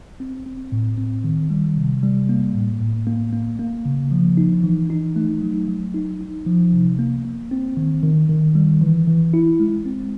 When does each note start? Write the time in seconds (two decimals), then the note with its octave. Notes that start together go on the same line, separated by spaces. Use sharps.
0.20 C4
0.46 C4
0.72 A2
0.98 C4
1.24 D#3
1.50 G3
1.77 C3
2.03 G3
2.29 A#3
2.54 A2
2.81 A2
3.07 A#3
3.33 A#3
3.59 A#3
3.85 C#3
4.11 F3
4.37 D#4
4.64 E3
4.90 D#4
5.16 A3
5.42 F#3
5.68 F#3
5.94 D#4
6.21 D#4
6.46 F3
6.73 C3
6.99 A#3
7.25 A#3
7.51 C4
7.77 D#3
8.03 D#3
8.29 D#3
8.55 G3
8.81 E3
9.08 E3
9.34 E4
9.60 G#3
9.86 C4